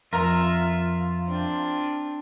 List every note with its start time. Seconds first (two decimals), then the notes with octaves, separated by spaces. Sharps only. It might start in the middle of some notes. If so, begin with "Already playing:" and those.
0.13 F2 F4 A#4 E5
1.27 C4 D4